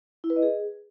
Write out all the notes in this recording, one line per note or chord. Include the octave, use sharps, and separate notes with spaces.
E4
B4
D#5
G#4